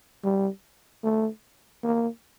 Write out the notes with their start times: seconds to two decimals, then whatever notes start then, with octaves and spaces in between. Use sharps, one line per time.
0.24 G3
1.04 A3
1.84 A#3